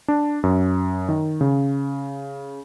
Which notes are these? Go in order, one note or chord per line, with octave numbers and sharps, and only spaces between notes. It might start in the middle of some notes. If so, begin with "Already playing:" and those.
D4
F#2
D#3
C#3